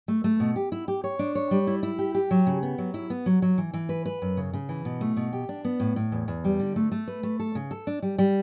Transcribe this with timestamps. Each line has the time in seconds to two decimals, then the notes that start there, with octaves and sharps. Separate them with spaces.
0.08 A3
0.24 A3
0.40 B2
0.56 G4
0.72 E4
0.88 G4
1.04 C#5
1.19 D4
1.35 C#5
1.51 G3
1.67 E4
1.83 E4
1.99 G4
2.15 G4
2.31 F#3
2.47 C#3
2.63 B3
2.78 F#3
2.94 E4
3.10 B3
3.26 F#3
3.42 F#3
3.58 E3
3.74 E3
3.89 B4
4.06 B4
4.22 F#2
4.37 C#3
4.53 C#3
4.69 E3
4.85 B2
5.01 A3
5.17 B2
5.33 G4
5.49 D4
5.65 B3
5.80 A2
5.96 A2
6.12 E2
6.28 E2
6.44 G3
6.60 D3
6.76 A3
6.92 A3
7.08 B4
7.23 A3
7.40 A4
7.55 C#3
7.71 A4
7.87 D4
8.02 G3
8.18 G3